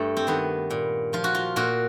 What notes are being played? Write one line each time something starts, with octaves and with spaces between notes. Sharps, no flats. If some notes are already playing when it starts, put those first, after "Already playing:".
Already playing: G2 A3
C4
D#3 B3
A#2
F3 F4
F#4
F4
A#2 F#4